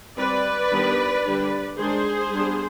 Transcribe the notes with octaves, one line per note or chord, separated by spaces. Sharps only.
G3 C4 B4 D5
D#3 G3 B3 D4
D3 G3 D4
D#3 G#3 D4 G#4 C5
G3 B3 D4